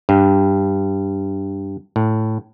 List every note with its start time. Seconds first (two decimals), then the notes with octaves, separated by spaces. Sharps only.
0.09 G2
1.96 A2